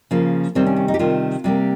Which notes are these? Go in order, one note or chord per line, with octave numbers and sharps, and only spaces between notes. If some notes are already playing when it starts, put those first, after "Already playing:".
C#3 F3 A#3
C3 D#3 G3 C4
C#4
C#4
D#4
G4
C3 D#3 G3 F4
C3 G3 A#3